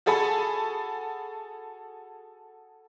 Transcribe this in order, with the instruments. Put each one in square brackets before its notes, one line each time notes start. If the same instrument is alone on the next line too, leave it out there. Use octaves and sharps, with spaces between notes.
[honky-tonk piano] F#4 G#4 A4 G#5 B5